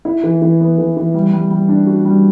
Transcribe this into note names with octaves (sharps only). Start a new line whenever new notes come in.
E4
E3
E3
B3
E3
E3
G3
G3
G3
D4
F#4
G3